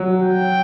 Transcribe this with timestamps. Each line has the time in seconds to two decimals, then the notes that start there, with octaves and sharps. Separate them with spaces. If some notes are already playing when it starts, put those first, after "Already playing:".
Already playing: F#3
0.22 G5